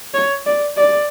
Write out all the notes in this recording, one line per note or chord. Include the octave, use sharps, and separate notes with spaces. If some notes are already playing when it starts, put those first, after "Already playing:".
C#5
D5
D5